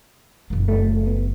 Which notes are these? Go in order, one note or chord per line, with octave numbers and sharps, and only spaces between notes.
F#1 A#3
A3
B3